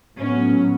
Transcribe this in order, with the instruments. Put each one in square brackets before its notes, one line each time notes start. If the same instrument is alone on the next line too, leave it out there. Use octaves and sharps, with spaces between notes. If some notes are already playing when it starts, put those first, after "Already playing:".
[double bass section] A2 F#3 B3 [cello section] C#4